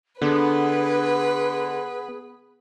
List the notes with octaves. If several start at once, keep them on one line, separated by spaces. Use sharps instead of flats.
D3 B3 G#4 B4